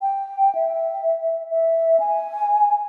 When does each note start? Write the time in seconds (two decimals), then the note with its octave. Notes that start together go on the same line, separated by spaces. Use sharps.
0.02 G5
0.55 E5
1.51 E5
2.00 G#5